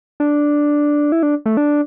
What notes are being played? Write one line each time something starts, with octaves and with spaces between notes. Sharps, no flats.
D4
E4
D4
A3
D4